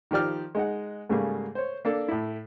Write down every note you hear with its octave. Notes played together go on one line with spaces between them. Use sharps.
D#3 F3 G4 D5 F6
G#3 D#4 F#5
G#2 C#3 G3 A3 A#3 G#4
C5 C#5
A#3 D4 A4
A2 E4